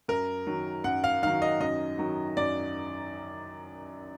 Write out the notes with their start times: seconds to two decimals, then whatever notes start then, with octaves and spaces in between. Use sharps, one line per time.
0.08 F#2 A#4
0.47 D#3 F#3
0.84 F#2 F#5
1.04 F5
1.23 D#3 F#3 F5
1.42 D#5
1.60 F#2 D#5
1.98 D#3 F#3
2.37 F#2 D5